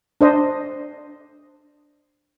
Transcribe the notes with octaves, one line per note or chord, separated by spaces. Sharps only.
D4 C5 D#5